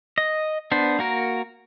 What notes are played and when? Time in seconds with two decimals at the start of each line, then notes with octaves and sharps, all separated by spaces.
0.18 D#5
0.72 B3 D4 C5
0.99 A#3 F#4 A#4